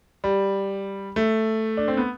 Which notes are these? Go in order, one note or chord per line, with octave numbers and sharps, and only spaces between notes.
G3
A3
D4
C4
B3